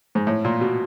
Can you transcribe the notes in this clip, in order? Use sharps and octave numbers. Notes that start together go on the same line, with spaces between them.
G#2
A2
A#2
B2